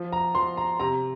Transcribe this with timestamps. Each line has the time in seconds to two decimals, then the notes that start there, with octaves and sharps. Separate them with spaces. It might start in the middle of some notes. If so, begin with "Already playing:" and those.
Already playing: F3
0.12 A#5
0.35 F3 C6
0.57 A#5
0.80 C3 A#5